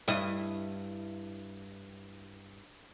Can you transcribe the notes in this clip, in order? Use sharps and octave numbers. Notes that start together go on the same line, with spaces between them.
G2 E4 D#5